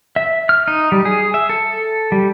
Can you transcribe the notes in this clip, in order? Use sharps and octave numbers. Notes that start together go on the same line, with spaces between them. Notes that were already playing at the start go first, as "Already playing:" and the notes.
E5
F6
D#4
G3
G#4
E5
A4
G3